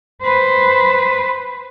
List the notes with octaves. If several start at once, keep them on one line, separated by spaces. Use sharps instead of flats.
B4 C5